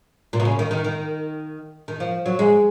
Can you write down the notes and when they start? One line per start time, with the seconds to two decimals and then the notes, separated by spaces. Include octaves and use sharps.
0.33 A#2
0.40 B2
0.45 C#3
0.59 D#3
0.71 D#3
0.84 D#3
1.88 D#3
2.00 F3
2.26 F#3
2.39 G#3